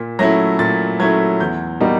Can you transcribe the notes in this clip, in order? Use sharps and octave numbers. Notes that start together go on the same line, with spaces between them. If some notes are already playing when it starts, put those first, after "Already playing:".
Already playing: A#2
F#3 A3 C#4 E4 A#6
A#2 A6
F#3 A3 C#4 E4 G#6
E2 G6
B2 G3 A#3 D#4